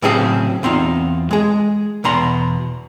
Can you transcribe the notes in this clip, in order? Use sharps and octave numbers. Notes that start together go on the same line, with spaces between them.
A2 C#3 F#3 C4 G#4 F5
E2 C4 D#4 F4
G#3 G#4
E2 B2 A#5 C6